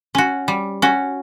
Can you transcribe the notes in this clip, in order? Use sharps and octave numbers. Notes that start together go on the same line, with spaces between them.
C#4 F#4
G3
C#4 F#4